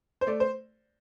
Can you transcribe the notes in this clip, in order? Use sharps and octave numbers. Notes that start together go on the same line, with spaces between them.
C5
A3 D5
C5